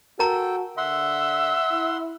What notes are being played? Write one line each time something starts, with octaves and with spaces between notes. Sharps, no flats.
F#4 A4 A#4 G5 A#5
D3 E5 F#5 C6
E4